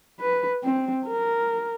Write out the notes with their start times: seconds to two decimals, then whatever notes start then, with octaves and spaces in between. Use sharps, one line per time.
0.20 B4
0.64 C4
1.06 A#4